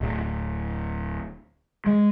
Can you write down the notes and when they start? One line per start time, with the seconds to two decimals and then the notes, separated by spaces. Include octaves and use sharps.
0.01 D1
1.86 G#3